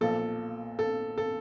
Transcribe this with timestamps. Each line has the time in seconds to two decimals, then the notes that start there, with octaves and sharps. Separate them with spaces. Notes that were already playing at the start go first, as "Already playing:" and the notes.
0.01 B1 A#2 F3 A4
0.79 A4
1.18 A4